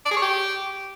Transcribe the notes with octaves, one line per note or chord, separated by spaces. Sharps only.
D5
G#4
C#5
G4